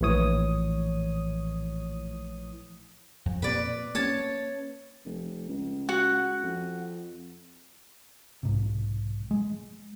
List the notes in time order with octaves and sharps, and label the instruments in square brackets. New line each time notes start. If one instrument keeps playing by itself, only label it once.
[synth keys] A#1 A2 E3 C#5 D#6
[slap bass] F2
[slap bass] A#2 C4 [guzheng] B4 D5
[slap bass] A#3 C#4 [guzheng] C#5 A5
[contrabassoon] F1
C#2
[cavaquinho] F#4 F#5
[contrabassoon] F2
[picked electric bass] B1 G#2 C3
G#3